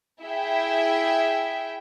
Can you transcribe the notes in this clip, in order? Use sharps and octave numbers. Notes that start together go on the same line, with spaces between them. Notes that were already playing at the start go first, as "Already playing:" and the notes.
E4 G#4 E5 G5